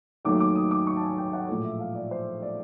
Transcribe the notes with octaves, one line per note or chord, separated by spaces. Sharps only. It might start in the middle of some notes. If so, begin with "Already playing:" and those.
D#2 D#3 F#3 A3 D6
D6
D#6
D6
C#6
A5
G#5
G5
F#5
A#1 A2 F3 A3
E5
F5
D5
C5
D5